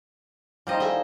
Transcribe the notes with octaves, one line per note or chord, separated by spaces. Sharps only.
F3 G3 D#4 C5 D#5
D3 D#3 D#5 E5 G#5